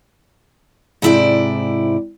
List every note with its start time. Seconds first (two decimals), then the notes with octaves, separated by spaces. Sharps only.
1.02 G#2 C3 E4 D5 G5